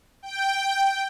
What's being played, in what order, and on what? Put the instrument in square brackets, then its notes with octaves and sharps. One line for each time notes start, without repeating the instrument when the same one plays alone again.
[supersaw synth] G5